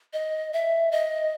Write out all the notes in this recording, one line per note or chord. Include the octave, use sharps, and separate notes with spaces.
D#5
E5
D#5